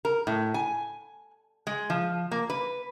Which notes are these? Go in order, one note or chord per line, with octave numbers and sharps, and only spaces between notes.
A#4
A2
G#5
G#3
F3
A#3
B4